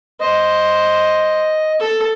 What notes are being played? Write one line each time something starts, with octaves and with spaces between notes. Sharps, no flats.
C5 D#5
A4